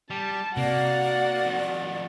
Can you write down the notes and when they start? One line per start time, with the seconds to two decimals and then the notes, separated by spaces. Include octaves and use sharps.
0.10 G3 A5
0.57 C3 A#3 F#4 D5 F#5
1.45 F2 D#3